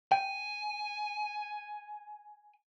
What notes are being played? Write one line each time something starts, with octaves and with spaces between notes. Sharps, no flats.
G5 G#5